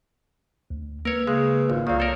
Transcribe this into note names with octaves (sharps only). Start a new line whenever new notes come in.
D2
A#3 A#4 B4 C#5 E6
C#3 G#3
G#1 F4
C2 D#3 A#3 C4 C#5 D5 D#6
A4 A#4 C#5